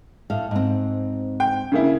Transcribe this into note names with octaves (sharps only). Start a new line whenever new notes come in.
A2 F5
G#2 C4
G5
C#3 A#3 E4